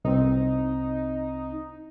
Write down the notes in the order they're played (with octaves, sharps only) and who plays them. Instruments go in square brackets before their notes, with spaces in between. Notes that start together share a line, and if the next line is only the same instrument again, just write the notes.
[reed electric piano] C2 C4 [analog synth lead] D#4